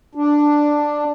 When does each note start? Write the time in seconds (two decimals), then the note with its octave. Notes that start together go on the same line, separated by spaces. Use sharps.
0.15 D4